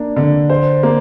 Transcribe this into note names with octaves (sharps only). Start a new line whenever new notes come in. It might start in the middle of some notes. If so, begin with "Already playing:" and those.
Already playing: A#3 D4
D3
C5
A#3